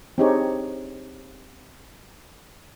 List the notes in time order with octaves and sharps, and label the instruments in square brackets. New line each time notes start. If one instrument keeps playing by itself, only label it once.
[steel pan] C4 D4 D#4 G4 G#4 C#5